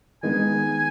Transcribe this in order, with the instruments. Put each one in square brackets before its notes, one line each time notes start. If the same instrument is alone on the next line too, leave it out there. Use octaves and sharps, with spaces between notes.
[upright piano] D#3 G#3 B3 D#4 [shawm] G#5